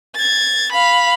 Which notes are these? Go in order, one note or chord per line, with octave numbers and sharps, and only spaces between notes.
G#6 A6
F5 B5